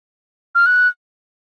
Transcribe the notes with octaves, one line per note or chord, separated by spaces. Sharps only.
F6
F#6